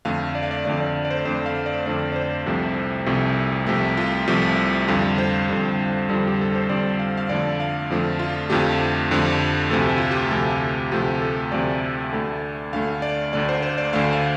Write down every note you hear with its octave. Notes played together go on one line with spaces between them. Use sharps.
F2 D3 A3 F5
D5
F5
D5
F2 D3 A3 D5
D5
D5
C5
F2 D3 A3 D5
F5
D5
F2 D3 A3 D5
D5
C5
C2 C3 F3 A3
C2 C3 F3 A3
C2 C3 F3 A3
F4
C2 C3 F3 A3
F2 D3 G3 F4
C5
F2 D3 G3
F2 D3 G3 F4
G4
A4
C5
F2 D3 G3 D5
F5
F5
F2 D3 F3 A3 D5
F5
F2 D3 F3 A3
F4
F2 D3 F3 A3 G4
F2 D3 F3 A3
D2 C3 F3 A3 A4
G4
F4
G4
D2 C3 F3 A3
D2 C3 F3 A3 G4
A4
D2 C3 F3 A3 D5
D2 D3 A3
D2 D3 A3 F5
D5
D2 D3 A3 D5
C5
C5
D5
D2 D3 A3 F5
F5